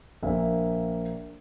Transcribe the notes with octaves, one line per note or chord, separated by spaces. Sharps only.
A#1 A#3 E5